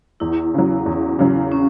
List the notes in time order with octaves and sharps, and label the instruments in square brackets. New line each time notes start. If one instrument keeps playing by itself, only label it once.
[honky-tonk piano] E2 [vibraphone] E4
[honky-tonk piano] C#3 F#3
E2
C#3 F#3
[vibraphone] C#4